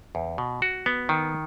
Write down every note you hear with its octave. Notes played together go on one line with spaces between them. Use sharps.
E2
B2
F#4
B3
D#3